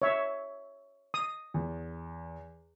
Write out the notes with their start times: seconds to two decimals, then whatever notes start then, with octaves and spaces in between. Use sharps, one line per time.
0.02 C#5 E5
1.14 D#6
1.54 E2